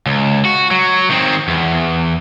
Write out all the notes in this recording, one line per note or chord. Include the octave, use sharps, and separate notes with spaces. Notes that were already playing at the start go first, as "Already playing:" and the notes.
C#2
F#4
F#3
D#3 C4
E2